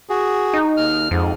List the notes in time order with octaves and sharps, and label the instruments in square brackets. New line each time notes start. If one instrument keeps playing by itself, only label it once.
[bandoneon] F#4 G#4
[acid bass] D#4
[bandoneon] D#2 F6
[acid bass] F2 [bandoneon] G#2